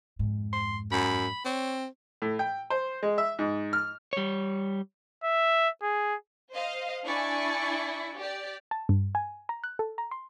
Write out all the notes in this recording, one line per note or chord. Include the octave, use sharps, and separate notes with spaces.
F2 G#2
C6
F#2 B5
C4 C#5
A2
G5
C5
G#3
E5
G#2
F6
G3 C#5
E5
G#4
C5 D#5 F5
D4 E4 D5 G#5 C#6 C#7
G4 D5
A5
G2
G#5
A#5
F#6
A4
A#5
C6